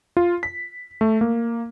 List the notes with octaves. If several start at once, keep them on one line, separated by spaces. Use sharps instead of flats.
F4
B6
A3
A#3